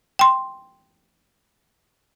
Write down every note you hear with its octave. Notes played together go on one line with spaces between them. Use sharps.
G5 C6